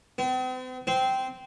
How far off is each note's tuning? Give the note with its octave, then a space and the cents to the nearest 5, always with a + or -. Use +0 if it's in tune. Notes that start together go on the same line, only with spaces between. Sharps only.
C4 -45
C4 -15